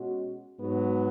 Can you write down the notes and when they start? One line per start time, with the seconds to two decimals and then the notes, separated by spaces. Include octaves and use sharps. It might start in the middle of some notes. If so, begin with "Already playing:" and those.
Already playing: B2 G#3 C#4 F#4
0.59 G#2 F#3 B3 F#4